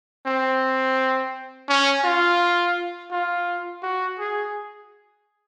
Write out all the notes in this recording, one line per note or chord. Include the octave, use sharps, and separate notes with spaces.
C4
C#4
F4
F4
F#4
G#4